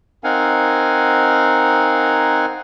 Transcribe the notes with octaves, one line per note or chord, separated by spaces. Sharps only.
C4 D#4 A#4 F5 F#5 G#5